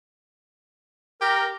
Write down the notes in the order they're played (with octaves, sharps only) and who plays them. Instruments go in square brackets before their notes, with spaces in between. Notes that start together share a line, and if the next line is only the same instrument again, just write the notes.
[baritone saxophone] G4 [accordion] A#4